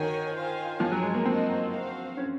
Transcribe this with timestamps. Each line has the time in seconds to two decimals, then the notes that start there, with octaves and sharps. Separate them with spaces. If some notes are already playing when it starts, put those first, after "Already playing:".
Already playing: D#3 F#4 A#4 C#5 G#5
0.34 F4 C5 F5 G#5
0.80 F3 G#4 C#5 G#5
0.92 F#3
1.02 G#3
1.15 A#3
1.25 C4 D#4 F#4 C5 D#5
1.71 F#4 C5 F5
2.17 C#4